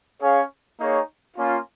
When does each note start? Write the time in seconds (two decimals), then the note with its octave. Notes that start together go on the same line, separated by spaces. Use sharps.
0.21 C#4 G#4 C#5 F5
0.79 A#3 D#4 G#4 C#5
1.36 A#3 C#4 F4